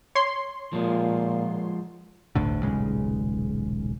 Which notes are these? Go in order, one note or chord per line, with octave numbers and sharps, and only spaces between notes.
C#5 C6
A#2 F3 G#3
G1 D2 A2 D3
D#1 B1 C#3 G#3